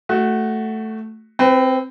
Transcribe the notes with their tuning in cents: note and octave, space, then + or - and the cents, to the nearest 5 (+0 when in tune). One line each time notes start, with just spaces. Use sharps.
A3 +0 F#4 +10
C4 +0 B4 +30